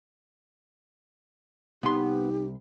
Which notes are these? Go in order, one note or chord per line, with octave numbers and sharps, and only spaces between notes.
C2 B3 D#4 G4 C6